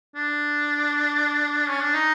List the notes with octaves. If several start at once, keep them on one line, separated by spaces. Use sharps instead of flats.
D4
C#4
D4
D#4